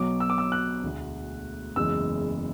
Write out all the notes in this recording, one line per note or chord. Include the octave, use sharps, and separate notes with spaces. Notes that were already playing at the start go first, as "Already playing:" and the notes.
Already playing: B1 B2 F#3 D6
E6
D6
E6
F#6
E1 D2 D3
F#1 E2 C#3 E3 G#3 E6